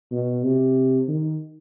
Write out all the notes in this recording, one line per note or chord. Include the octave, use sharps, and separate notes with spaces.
B2
C3
D#3